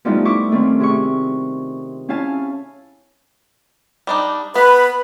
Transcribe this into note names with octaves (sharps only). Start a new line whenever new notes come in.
F3 G3 A3 B3 D#4 E4
E4 C#6 D6
D#3 A3 C4 C#4
C3 G#4 C#6
C#4 E4 F5 G#5 A5
G3 D4 D#4
B3 B4 B5